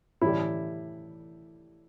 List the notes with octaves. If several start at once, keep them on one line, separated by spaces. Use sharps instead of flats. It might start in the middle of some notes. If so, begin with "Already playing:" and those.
A2 E3 G3 E4